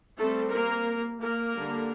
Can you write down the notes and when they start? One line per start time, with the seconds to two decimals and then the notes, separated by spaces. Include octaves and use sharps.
0.18 G3 A3 C4 A4
0.52 A#3 A#4
1.20 A#3 A#4
1.54 D3 G3 D4